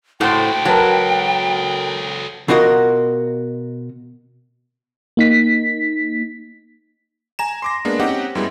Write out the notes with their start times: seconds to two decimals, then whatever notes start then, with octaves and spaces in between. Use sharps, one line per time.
0.21 A2 F#4 A4 C5 F#5 G5
0.65 F#3 A#4 B4 A5
2.48 B2 F4 F#4 A#4 D#5
5.17 A#3 D#4 B6
7.39 G#5 A#5 E7
7.62 C6 D6 A#6
7.85 G#3 A#3 B3 D4
8.00 C4 C#4 D#4 G4 F#5
8.35 F#2 G3 G#3 B3 E4